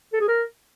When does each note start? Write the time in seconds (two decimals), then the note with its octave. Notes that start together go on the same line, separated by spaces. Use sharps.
0.13 A4
0.21 G#4
0.28 A#4